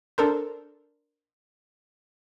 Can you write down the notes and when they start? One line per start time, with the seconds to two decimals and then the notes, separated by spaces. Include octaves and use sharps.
0.18 D4 A4 A#4 C5